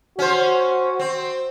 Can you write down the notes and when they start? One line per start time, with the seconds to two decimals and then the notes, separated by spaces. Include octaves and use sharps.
0.19 C#4 F#4 C5
0.99 C4